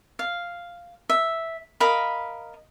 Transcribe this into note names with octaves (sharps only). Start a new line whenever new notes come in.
F5
E5
A#4 D#5 F5 B5